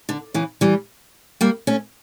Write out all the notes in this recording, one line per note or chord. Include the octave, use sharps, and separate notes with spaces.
D3
C#3 E3
E3 G3
G3 A#3
A3 C#4